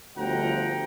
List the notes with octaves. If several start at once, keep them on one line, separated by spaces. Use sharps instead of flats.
G1 D2 F3 F#5 G5 A#5